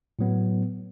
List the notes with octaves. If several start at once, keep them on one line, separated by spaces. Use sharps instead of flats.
A2 F#3 B3